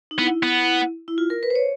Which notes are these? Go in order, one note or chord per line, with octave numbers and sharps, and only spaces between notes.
D#4
B3 E4
B3
E4
F4
A#4
B4
C5
C#5